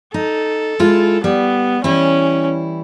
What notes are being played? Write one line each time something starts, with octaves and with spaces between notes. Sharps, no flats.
D#4 A4
G#3 E4 F4
G3 B3
E3 G3 C#4 E4